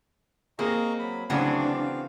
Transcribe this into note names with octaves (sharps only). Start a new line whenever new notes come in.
A#3 C4 G#4 D#5 A#5 C#6
F#3 B5
D2 C#3 E3 F#3 C4 D4 F#4 F5